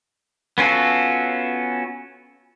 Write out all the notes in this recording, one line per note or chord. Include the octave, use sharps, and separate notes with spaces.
B3 C#4 F4 F#4 A4